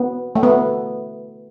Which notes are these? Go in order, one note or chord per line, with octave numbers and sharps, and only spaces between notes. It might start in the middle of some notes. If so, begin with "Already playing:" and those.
Already playing: B3
A3
B3